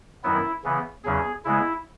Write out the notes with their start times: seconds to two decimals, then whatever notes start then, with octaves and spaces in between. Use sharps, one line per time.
0.24 F#2 D#3 F#3 B3 E4
0.64 C#3 E3 B3
1.04 E2 C#3 F#3 C#4 G#4
1.45 C#3 G#3 B3 E4